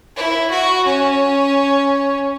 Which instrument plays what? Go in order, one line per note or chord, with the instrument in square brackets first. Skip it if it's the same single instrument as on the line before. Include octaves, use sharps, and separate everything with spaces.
[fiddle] E4
F#4
C#4